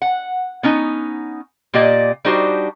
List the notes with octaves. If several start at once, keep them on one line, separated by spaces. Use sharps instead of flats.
F#5
B3 C#4 D#4
A#2 A#3 G4 D5 D#5
G3 D4 D#4 F#4 G4 C5